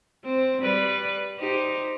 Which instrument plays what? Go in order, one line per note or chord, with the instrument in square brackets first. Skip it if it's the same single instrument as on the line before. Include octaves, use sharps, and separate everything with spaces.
[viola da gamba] C4
G3 B4 D5
D#4 G4 C5